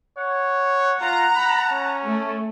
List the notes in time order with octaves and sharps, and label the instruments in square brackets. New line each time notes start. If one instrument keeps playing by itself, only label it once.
[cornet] C#5 [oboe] F#5
[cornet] F4 [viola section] A#5
[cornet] B5
C#4
[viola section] A3